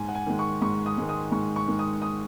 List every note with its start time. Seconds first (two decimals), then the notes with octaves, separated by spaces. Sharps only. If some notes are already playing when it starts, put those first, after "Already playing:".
Already playing: G#2 G#5
0.09 F#5
0.15 G#5
0.27 D#3 G#3
0.39 C#6
0.62 G#2 C#6
0.86 D#6
0.98 D#3 G#3
1.09 D#6
1.32 G#2 C#6
1.56 C#6
1.68 D#3 G#3
1.79 D#6
2.02 D#6